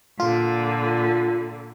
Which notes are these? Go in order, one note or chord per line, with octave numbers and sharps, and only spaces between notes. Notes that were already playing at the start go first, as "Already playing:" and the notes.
A#2 D3 F4